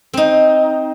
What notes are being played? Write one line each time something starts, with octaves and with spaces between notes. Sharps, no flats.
C4 D#4